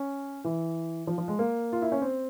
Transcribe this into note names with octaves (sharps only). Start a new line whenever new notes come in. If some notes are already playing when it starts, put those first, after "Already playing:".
Already playing: C#4
E3
F3
F3
G#3
A#3
F4
E4
C#4
C4